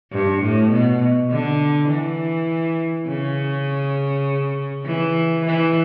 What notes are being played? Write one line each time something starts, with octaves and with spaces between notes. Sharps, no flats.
G2
A2
B2
D3
E3
C#3
E3
E3